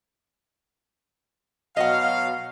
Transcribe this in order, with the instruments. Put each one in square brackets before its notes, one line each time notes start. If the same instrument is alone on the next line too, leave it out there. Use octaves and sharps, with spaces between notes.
[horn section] B2 F#3 F5 [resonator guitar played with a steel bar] D#5 F#5